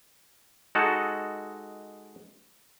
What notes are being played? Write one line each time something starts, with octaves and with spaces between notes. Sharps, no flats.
G#3 D#4 F#4 A4